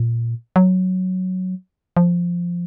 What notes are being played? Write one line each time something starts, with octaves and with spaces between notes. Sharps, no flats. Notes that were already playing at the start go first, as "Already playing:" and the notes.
Already playing: A#2
F#3
F3